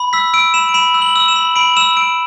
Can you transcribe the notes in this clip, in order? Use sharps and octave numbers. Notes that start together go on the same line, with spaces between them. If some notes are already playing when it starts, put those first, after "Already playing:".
Already playing: B5
E6 B6
E6 D7
B5 E7
D7
B5 E7
E6
F#7
E6
E7
B5
B5 D7
E6 E7
E6 D7